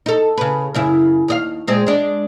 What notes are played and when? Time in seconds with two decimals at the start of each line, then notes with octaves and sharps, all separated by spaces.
0.06 D#4 A4
0.37 C#3 B4
0.74 F#2 C#3 E4
1.28 D#2 D#5 F5
1.67 A#2 G#3 C4
1.87 G#3 D4